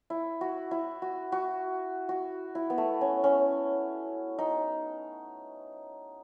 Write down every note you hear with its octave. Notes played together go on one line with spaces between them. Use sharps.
E4
F#4
E4
F#4
F#4
F#4
E4
B3
A3
C#4
C#4
D#4